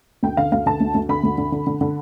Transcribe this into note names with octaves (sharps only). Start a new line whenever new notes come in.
D2 G5
D3 F5
D2 F5
D3 A5
D2
D2
D3 B5
D2
D3
D3
D3
D3